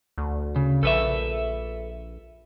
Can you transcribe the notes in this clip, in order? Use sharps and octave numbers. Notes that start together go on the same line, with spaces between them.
D2
C#3
A#1 A4 B4 E5